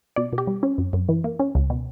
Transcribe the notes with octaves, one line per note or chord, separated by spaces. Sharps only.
B2 D5
B2
G4
G3
C#4
F#2
F#2
E3
A#3
C#4
C#2
B2